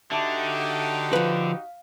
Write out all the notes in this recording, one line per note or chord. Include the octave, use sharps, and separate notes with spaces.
D3 D#4 F#4 G4 E5 A5 D6
F3 B4 F5